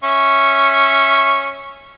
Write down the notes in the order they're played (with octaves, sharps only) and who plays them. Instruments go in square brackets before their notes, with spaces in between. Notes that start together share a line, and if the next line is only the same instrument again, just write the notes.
[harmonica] C#4 E5 C#6